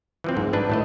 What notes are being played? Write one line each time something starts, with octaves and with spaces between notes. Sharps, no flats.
E3 F3 C4
G#2
E3 D4 B4
A2 A3 D#5